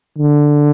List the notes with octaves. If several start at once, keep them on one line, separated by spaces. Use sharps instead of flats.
D3